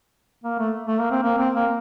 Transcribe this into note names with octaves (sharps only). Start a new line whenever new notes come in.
A#3
A3
A3
A#3
C4
A#3
C4
A#3